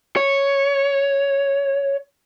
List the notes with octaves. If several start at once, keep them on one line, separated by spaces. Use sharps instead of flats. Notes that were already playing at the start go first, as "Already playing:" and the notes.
C#5